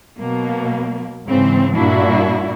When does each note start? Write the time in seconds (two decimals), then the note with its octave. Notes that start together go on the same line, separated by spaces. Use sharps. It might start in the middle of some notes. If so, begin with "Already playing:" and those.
0.19 B2 F#3 A#3
1.27 G#2 C#3 E3 C4
1.76 G2 A#2 A#3 D4 E4 F#4